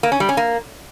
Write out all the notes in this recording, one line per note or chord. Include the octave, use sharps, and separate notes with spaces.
A#3
C#4
G3
C#4
A#3